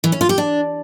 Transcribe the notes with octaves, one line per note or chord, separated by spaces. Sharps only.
E3
C#4
F4
G4
D4